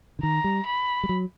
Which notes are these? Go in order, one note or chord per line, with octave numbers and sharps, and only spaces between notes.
D3
D#3 A#5
G3
B5
G3
F#3